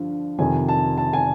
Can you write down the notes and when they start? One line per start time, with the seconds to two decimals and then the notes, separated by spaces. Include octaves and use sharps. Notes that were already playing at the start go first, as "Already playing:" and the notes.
Already playing: G2 D3 F3
0.39 F2 C3 D#3 G#5
0.69 A5
0.98 A5
1.13 G#5